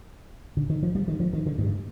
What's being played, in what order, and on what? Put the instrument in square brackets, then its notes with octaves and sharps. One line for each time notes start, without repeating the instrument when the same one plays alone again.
[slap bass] D3
D#3
F3
G3
D#3
F3
D#3
D3
G2